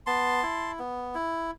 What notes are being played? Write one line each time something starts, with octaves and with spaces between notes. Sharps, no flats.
B3 A5 C6
E4
B3
E4